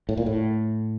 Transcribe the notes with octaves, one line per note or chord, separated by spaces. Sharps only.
A2
A#2
A2